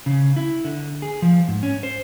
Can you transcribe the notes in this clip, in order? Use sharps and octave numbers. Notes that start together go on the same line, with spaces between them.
C#3
E4
D3
G#4
F3
G#2
C#4
C5